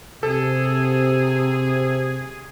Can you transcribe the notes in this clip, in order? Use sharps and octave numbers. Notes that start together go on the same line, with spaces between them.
C3 G#4 A4